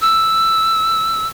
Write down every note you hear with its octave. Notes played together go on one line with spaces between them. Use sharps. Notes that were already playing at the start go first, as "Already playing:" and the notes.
E6